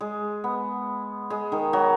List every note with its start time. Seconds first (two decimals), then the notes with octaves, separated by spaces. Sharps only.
0.01 G#3
0.44 B3
1.30 G#3
1.52 D#3
1.73 F#3